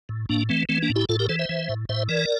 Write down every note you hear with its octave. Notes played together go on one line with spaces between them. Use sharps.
A2
A2 A#3 D4
E3 A3 C4
E3 A3 C4
A#3 D4
A2
E4 G4
A2 F4 A4
G4 A#4
E3 A4 C5
C5 E5
E3
A2
A2 C5 E5
E3 A#4 D5